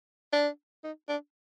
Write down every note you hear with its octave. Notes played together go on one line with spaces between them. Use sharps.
D4
D#4
D4